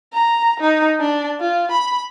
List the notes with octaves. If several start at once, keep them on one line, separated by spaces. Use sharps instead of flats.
A#5
D#4
D4
F4
B5